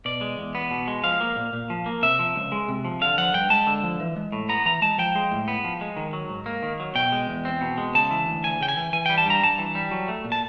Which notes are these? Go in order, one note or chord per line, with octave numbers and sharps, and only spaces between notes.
B2 D5
G#3
E2
B3
B2
G#3
F3 F5
A#3
A#2
A#2
F3
A#3
C3 E5
F3
C#2
G#3
C3
F3
D3 F5
F3 F#5
G2 G5
G#3 A5
D3
F3
E3
G#3
A2
B3 A#5
E3 A#5
G#3 A5
F3 G5
G#3
A2
B3
F3
G#3
D#3
F#3
G#2
A#3
D#3
F#3
B2 G5
G#3
E2
C4
B2
G#3
C#3 A5
E3
D2
D2 G#5
C#3 G5
G#5
E3
E3 G#5
G3 G5
A5
G2 A#5
G2 A5
E3
G3
F#3
A3
A#2
A5